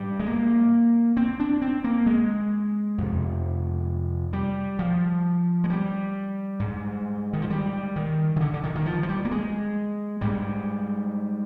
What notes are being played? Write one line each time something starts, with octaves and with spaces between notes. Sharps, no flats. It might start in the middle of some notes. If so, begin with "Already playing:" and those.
Already playing: G#2 G3
G#3
A#3
C4
D4
C4
A#3
G#3
F2 C3
G3
F3
G#3
G3
G#2
D#3
F3
G3
D#3
D#3
D3
D3
D#3
D#3
F3
F3
G3
A#3
G#3
G#2 G3